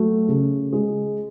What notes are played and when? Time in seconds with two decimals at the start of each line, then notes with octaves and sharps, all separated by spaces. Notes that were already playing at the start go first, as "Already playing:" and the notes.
Already playing: F#3 A3
0.28 C#3
0.73 G#3